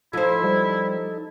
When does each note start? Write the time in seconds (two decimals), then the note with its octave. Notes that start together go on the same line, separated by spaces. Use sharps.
0.13 F3 D#4 E4 A4 C5
0.44 G3